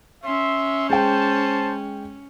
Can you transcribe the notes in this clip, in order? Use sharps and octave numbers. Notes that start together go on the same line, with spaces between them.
C#4 E5 C6
G#3 C5 G5 A5